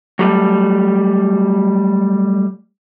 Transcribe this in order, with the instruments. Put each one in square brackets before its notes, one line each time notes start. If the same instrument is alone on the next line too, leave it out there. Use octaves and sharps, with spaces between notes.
[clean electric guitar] F#3 G3 A3